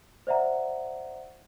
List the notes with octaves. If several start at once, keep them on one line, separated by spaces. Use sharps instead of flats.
C5 D5 E5 F#5 A#5